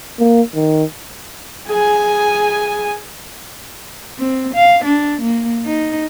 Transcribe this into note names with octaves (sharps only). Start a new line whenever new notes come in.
A#3
D#3
G#4 G#5
C4
F5
D4
A#3
D#4